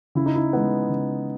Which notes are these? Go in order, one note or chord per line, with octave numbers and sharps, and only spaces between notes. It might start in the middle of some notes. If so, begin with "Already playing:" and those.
C#3 E4
D#4
E4
G#3 B3
C#3